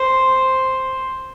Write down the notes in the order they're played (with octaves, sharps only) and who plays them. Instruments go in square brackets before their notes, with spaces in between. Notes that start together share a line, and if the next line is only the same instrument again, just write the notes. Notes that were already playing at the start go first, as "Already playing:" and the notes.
Already playing: [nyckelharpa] C5